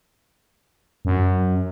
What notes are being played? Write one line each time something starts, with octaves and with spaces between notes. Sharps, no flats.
F#2